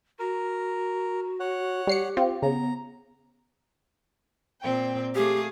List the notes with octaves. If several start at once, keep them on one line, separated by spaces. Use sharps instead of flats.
F#4 A#4
C#5 F#5
G3 G4 C7 C#7
C4 F4
C#3 B3 A#5
A#2 C4 G5
A3 G4 G#4 F5